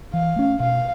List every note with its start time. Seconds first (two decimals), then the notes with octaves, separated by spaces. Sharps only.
0.13 E3 F5
0.36 A3 C#4
0.60 B2 F5